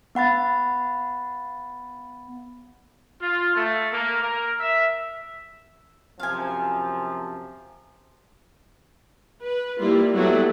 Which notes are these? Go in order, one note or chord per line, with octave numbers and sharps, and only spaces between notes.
B3 F#5 B5 A6
F4
A3
A#3
A#4
E5
F#2 C3 F3 F5 G#5
B4
G3 A#3 E4 F4
F#3 G3 A3 B3 E4 F#4